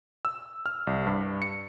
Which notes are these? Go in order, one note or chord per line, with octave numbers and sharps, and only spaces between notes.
E6
F6
C2
G2
C#7